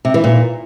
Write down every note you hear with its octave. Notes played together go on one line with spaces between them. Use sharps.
C3
E3
A#2